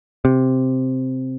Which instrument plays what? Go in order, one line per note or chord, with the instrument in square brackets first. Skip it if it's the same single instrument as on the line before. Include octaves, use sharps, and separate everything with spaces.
[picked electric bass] C3